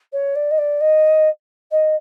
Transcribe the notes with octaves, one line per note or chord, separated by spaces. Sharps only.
C#5
D5
D#5
D5
D#5
D#5